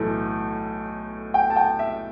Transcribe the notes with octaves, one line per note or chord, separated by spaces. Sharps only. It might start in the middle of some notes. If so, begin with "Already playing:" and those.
Already playing: B1 A2 E3 A3
G5
A5
G5
E5